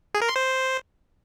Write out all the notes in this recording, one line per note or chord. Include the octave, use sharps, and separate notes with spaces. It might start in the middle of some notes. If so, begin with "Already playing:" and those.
G#4
A#4
C6
C5